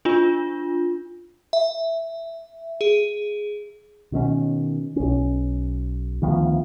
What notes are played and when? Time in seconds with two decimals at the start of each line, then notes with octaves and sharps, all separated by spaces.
0.05 D4 F4
1.53 E5
2.81 G#4
4.12 B2 D#3 C4 C#4
4.96 B1 C#4
6.22 D2 D#3 F3 B3